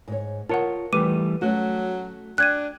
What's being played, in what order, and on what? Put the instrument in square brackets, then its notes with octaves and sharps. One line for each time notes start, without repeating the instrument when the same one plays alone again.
[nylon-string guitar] G#2 C#5
[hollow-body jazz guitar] F4 C#5 [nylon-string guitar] A#4 [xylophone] F#5 A5
[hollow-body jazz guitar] E3 G3 A3 [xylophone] B4 D6 D#7
[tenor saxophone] F#3 [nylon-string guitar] A3 C#4 [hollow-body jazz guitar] F#4
[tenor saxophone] D4 [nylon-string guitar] G5 [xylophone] F#6 G#6 D#7